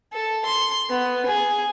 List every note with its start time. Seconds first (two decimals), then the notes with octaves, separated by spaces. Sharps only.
0.13 A4
0.45 C6
0.89 B3
1.26 G#4